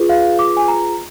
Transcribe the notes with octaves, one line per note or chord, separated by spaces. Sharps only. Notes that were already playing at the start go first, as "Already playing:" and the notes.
Already playing: F4 G#4 B4
F5
D6
G#5
A#5